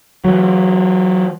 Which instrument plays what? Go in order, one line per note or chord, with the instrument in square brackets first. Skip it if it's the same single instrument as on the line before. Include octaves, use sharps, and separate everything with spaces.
[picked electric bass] E3 F#3